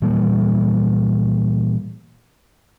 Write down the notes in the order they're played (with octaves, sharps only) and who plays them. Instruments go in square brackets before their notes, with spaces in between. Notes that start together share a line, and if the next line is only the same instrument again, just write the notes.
[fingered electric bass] A#2 E3 G3 A#3